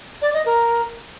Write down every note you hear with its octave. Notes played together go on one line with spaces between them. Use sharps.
D5
D#5
A#4